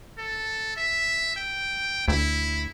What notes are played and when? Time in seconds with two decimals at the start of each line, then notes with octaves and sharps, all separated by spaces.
0.18 A4
0.77 E5
1.36 G5
2.08 D2 E4